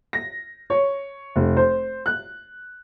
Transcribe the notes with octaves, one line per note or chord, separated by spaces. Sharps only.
A#6
C#5
F1
C5
F#6